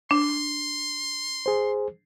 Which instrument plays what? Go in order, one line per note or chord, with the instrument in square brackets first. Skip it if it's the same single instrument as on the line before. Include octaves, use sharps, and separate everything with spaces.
[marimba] D4 [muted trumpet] C6
[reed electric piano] G#4 C5